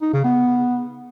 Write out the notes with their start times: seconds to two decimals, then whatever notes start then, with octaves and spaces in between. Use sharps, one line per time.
0.02 D#4
0.13 C#3
0.24 B3